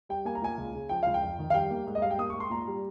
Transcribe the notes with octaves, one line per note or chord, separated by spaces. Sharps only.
G3 G5
A#3 G#5
A#5
A#2 G#5
C#2
C#3
F3 G5
C#2 F5
G5
F2
D#3
F5
G3 G5
A#3
G#2
D#5
G3 F5
G5
A#3 D#6
G#2 C#6
C6
A#2 A#5
G3